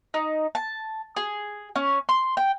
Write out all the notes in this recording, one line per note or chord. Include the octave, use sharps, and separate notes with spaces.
D#4
A5
G#4
C#4
C6
G5